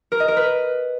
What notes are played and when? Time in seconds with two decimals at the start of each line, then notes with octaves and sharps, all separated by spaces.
0.12 A#4
0.20 D#5
0.28 A#4
0.37 B4